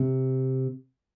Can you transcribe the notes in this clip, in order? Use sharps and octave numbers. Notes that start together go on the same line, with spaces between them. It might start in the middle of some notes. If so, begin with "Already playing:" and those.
Already playing: C3